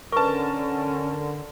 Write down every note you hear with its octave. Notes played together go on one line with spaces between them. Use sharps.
D3 C#4 A#4 B4 A5 C#6